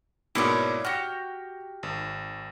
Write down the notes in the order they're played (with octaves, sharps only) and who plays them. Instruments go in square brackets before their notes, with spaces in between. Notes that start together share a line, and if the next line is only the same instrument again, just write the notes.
[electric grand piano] G#2 B2 A#3 [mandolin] E4 C#5 D5
[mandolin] F#4 G4 [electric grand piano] F6 A#6 C#7
[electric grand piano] G#1